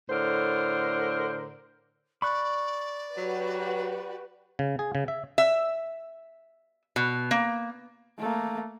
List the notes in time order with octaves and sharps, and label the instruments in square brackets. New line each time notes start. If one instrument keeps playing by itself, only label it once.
[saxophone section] A2 D3 A#4 C5
[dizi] D5 [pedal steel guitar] B5 C#6 F#6
[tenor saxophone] F#3 [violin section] F#4 G4 B4
[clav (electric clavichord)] C#3
G#4
C#3
E5
[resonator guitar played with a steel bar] E5
B2
A#3
[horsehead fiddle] A3 A#3